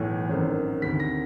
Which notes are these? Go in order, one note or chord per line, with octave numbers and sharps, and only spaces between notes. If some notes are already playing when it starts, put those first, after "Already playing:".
Already playing: B1 A2 E3
G#1 F#2 D#3
D2 C3 D#3 B6
A#6